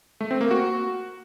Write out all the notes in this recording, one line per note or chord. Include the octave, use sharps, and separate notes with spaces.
A3
C4
A#3
F#4